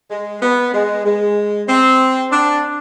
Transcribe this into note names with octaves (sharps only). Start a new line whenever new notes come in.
G#3
B3
G#3
G#3
C4
D4